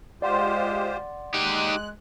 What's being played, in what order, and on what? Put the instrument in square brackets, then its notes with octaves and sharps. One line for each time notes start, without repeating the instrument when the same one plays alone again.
[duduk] G#3 [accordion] F4 G4 C5 [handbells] D5 F#5 C6
[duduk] G#3 [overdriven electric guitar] D#4 G4 [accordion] F#6